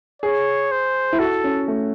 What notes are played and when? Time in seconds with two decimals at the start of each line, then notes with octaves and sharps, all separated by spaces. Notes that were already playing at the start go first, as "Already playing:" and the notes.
0.22 G#4 C#5
0.72 C5
1.13 E4
1.19 F#4 A4
1.44 C#4
1.68 A3